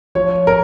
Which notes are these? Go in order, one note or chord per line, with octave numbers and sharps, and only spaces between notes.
F3 C#5
A#4